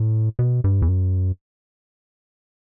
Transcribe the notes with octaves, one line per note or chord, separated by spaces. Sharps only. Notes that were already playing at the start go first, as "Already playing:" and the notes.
Already playing: A2
B2
G2
E2
F#2